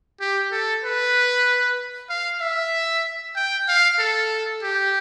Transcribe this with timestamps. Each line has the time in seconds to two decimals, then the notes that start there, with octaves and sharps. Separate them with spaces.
0.20 G4
0.52 A4
0.84 B4
2.10 F5
2.41 E5
3.36 G5
3.68 F5
3.99 A4
4.63 G4